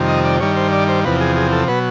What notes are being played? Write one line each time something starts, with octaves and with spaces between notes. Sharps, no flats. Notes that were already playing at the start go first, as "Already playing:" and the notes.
Already playing: F2 C3 D#3 G3
D#5
D5
G2 D#3 G3 C#5
C5
D5
C5
E2 C3 F3 B4
G#4
G#4
A4
B2 F#3 B4